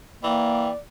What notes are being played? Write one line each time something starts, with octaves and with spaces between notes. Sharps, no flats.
E3 A#3 D5 G5